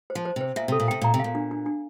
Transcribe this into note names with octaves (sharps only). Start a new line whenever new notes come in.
C5
F3
C5
C3 C5
A#2 E5
C3 A4
A#2
C3 G5
A#2 A#5
C3
A#2 F5
D4
D4
D4